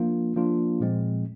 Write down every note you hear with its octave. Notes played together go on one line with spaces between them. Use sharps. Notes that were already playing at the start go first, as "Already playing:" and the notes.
Already playing: F3 A#3 D4 F4
F3 A#3 D4 F4
A#2 F3 G#3 C4